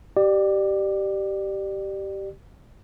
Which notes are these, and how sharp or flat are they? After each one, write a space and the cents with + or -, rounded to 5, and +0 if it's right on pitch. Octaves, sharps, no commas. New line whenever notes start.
G4 -15 D5 +25